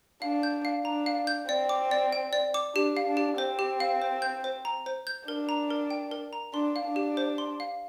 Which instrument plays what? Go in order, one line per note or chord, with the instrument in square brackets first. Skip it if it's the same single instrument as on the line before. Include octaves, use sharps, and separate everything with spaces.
[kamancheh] D4 [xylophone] F5
[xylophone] G6
F5
[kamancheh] D4 [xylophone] A#5
[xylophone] F5
G6
[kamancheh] C4 [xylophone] D5
[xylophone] D6
D5
G5
D5
D6
[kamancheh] D4 [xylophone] G4
[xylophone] F5
[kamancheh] D4
[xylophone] G4
[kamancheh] C4 [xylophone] C5
[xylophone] G4
F5
C5
G6
C5
A#5
C5
G6
[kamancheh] D4 [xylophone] A#4
[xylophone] A#5
A#4
G5
A#4
A#5
[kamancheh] D4 [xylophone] C6
[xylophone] F5
[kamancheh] D4
[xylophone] G4
C5
C6
F5